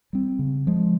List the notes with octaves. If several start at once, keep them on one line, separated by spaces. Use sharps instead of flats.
G3 C4
C#3
F3 G#3